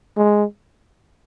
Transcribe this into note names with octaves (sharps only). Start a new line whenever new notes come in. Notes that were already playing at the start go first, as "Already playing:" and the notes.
G#3